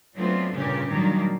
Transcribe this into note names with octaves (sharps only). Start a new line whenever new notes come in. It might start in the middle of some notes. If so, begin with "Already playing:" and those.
F#3 A3 B3 C4 D4 F4
G2 A#2 C#3 C#4 G4
A#2 D#3 F#3 G3 A#3 D4